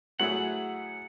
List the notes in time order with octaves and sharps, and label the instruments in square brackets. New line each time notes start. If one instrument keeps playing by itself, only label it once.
[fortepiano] A2 F#3 A3 E4 G#4 [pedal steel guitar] F#5